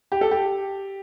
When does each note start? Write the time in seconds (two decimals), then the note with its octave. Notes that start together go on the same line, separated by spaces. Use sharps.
0.12 G4
0.21 A4
0.31 G4